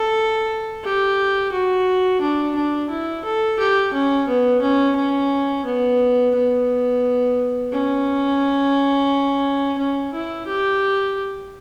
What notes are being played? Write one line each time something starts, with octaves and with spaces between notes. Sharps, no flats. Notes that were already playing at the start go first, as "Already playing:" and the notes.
Already playing: A4
G4
F#4
D4
D4
E4
A4
G4
C#4
B3
C#4
C#4
B3
B3
C#4
C#4
E4
G4